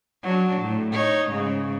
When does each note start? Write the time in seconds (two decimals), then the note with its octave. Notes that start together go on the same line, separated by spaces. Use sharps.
0.24 F#3 D4
0.62 A2
0.92 D#4 C#5
1.30 G#2 C#3